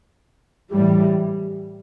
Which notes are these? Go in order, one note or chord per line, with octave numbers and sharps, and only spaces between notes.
A2 E3 G3